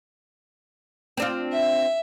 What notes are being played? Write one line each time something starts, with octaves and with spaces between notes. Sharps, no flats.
C4 D4 F4
E5